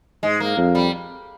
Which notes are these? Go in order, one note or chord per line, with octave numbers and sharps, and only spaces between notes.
G#2 G#3
A#3
F2
G3